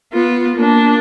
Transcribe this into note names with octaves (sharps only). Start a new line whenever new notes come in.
B3 F4
A#3 D4